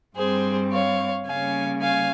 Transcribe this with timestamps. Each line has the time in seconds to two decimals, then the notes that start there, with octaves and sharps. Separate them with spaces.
0.16 G2 G3 C4 G#4 C5
0.71 C#5 F5
1.26 C#3 G3 A#3 C#4 F5 G#5
1.81 F5 G#5